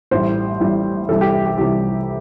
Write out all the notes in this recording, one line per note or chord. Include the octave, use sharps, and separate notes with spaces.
A1 A2 G3 C5
A1 A2 G3
C2 C3 E3 G3 A4
G4
E4
G4
C2 C3 E3 G3 G4